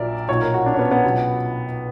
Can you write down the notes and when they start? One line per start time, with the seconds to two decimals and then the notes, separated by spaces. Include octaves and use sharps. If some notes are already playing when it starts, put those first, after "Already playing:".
Already playing: A#1 A#2 F#3 A#4 D5 E5
0.28 B1 A#2 F#3 C#5
0.41 A#4
0.54 F#4
0.66 D4
0.74 C#4
0.79 B3
0.91 B3
1.04 C#2 B2 F#3